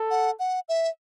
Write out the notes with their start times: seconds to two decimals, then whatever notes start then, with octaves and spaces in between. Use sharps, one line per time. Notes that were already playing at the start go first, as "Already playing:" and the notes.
Already playing: A4
0.11 F#5
0.39 F#5
0.69 E5